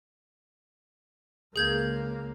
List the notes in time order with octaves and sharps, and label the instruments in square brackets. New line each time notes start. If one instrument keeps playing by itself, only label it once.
[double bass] C#2 A#3 [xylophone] G#4 G6 G#6